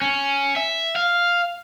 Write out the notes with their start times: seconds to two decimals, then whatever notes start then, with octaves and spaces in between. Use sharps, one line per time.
0.02 C#4
0.56 E5
0.96 F5